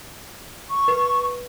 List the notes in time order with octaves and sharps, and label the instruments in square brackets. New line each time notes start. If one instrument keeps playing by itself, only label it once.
[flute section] C#6
[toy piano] B4